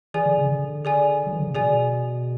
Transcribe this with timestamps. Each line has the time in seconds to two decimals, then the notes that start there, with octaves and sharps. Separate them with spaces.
0.14 E3 G#4 D5 G#5
0.26 D3
0.37 C#3
0.49 D3
0.85 G#4 D5 G#5
1.26 F#3
1.33 E3
1.40 D3
1.47 C#3
1.54 B2 G#4 D5 G#5